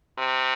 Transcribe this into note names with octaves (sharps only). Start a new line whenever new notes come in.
C3